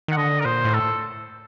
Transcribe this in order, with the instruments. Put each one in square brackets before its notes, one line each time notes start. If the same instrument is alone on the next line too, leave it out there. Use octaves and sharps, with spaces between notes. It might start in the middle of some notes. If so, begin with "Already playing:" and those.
[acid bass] D#3 [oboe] F#5
[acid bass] D3 [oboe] D#5
[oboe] A#4
[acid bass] A#2 [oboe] C5
[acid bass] A2
[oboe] A4